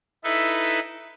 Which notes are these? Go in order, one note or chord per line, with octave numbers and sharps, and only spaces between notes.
D#4 E4 A4 B4 E5